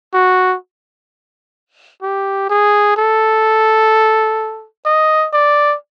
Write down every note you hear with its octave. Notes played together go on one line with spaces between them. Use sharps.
F#4
G4
G#4
A4
D#5
D5